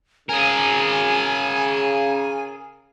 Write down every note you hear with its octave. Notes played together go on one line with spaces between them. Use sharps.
C#3 G#4 A#4 G#5